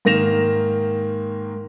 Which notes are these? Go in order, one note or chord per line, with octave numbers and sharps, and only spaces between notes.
G#2 D#3 A#3 A#6 E7 F7